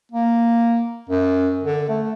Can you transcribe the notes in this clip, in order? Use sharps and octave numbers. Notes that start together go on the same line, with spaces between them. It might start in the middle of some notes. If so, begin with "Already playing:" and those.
A#3
F#2
D3
A3